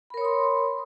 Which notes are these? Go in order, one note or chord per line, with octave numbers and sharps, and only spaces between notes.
A#4 C#5 B5 C6 D#6